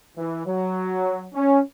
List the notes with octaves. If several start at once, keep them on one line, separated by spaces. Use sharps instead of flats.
E3
F#3
C#4